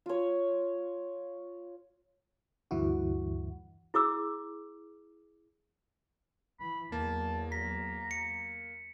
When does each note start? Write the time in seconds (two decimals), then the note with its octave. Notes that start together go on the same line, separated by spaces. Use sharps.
0.06 F4 C#5
2.71 D2 G2 E3 E4 F#4
3.94 E4 G#4 D6 E6
6.60 E3 B5
6.92 E2 F#3 A#3 A5
7.52 A#5 B6
8.11 C#7